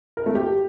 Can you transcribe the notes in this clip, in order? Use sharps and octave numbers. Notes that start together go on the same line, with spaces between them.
A#4
A3
G4